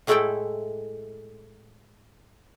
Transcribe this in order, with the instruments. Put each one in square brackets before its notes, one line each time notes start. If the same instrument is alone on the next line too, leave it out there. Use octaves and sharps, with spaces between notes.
[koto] A2 G#3 A3 E4 A4 G5